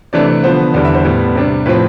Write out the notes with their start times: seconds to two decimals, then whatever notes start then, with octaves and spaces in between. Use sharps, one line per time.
0.13 C3 E3 A3 D4 D5
0.28 D5
0.43 D3 F3 B3 C5
0.74 E2 D3 G3 D5
0.85 E5
0.94 C5
1.05 A2 G3 B3
1.35 C3 G3 D4
1.66 A2 F3 C4 B4